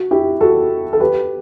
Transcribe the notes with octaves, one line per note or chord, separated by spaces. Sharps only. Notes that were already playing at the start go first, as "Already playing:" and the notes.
Already playing: F#4
E4 G4
F#4 A4
A4
G4 B4